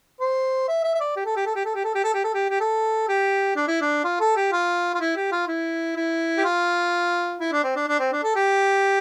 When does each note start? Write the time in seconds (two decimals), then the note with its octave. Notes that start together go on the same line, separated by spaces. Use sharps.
0.20 C5
0.68 E5
0.84 E5
0.95 E5
1.01 D5
1.16 G4
1.26 A4
1.36 G4
1.46 A4
1.55 G4
1.65 A4
1.75 G4
1.84 A4
1.95 G4
2.04 A4
2.14 G4
2.24 A4
2.34 G4
2.50 G4
2.61 A4
3.08 G4
3.56 D4
3.68 E4
3.81 D4
4.04 F4
4.20 A4
4.36 G4
4.52 F4
4.94 F4
5.00 E4
5.16 G4
5.31 F4
5.47 E4
5.96 E4
6.38 G4
6.44 F4
7.40 E4
7.52 D4
7.64 C4
7.76 D4
7.88 D4
7.99 C4
8.12 D4
8.24 A4
8.36 G4